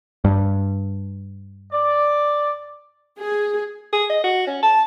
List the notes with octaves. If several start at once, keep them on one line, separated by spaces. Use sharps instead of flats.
G2
D5
G#4
G#4
D#5
F#4
C#4
A5